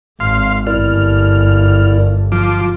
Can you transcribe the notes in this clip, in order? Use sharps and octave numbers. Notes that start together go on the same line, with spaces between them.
G#1 F5 C6
G1 E4 A#4 D5 F6
F3 F4 D6